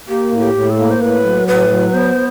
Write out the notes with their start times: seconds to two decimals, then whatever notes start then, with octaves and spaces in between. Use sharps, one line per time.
0.08 A#3 G4
0.31 A2
0.39 G4
0.54 A2
0.70 A4
0.78 A#3
0.90 C5
1.00 A2 B4
1.24 F#3
1.48 A2 B4
1.71 F#3
1.94 B3 C5